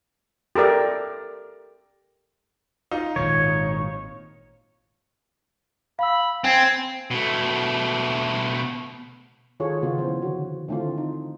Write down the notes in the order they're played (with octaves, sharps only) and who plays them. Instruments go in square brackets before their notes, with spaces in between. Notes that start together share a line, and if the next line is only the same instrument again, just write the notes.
[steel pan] G4 A4 A#4 D5
[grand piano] D#4 [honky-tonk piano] F4
[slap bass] G#1 A#2 D#3 [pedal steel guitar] C#5
[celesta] F5 E6 [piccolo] B5
[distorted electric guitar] C4 [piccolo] G#5
[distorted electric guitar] B2 A3
[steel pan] D#3 D#4 F4 G#4 A4 C#5
C#3 B3 F4
E3 F3 C5
D3 D#3 F#4 C#5
D3 D#3 A3 C4 E4 F4
D#4